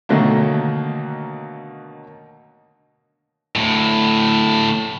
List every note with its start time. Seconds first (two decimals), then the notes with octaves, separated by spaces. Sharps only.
0.09 B2 D3 D#3 F#3 A3 A#3
3.56 D2 A2